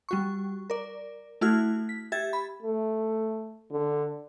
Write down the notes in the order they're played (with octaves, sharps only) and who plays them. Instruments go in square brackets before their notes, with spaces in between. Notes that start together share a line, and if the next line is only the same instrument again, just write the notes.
[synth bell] G3 F#4 C#6
A#4 D5
A3 E4 F#4 F6 G#6
B6
G4 E5 G#6 A6
B5
[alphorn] A3
D3